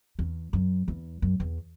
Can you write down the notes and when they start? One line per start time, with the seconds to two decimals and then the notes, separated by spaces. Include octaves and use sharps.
0.19 E2
0.53 F#2
0.88 E2
1.22 F#2
1.40 E2